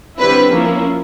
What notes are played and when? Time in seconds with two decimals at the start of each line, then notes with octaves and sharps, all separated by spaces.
0.18 D3 G3 C4 E4 B4
0.51 F3 A#3 C#4 E4